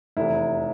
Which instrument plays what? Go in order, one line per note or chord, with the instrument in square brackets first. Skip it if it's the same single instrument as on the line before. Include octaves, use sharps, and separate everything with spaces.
[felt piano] F1 E2 C3 E4